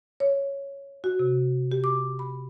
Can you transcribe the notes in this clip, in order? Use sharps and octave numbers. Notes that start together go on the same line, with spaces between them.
C#5
F#4
C3
G4
D6
B5